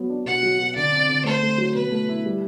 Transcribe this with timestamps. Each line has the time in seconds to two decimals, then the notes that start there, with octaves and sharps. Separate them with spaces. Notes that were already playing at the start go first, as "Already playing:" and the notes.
Already playing: F#3 B3
0.10 D4
0.26 B2 F#5
0.43 F#3
0.59 B2
0.75 D3 D5
0.92 C4
1.09 D3
1.25 A3 C5
1.42 A3
1.58 F#3
1.75 B2 B4
1.92 A3
2.09 E4
2.25 G3